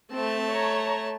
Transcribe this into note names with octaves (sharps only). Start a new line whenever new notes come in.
A3 C4 A5
C#5 A#5